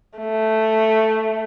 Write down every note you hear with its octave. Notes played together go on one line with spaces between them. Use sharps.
A3